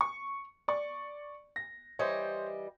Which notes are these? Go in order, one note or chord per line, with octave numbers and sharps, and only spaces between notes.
C#6
D5 C#6
A#6
E3 G3 C5 C#5 D#5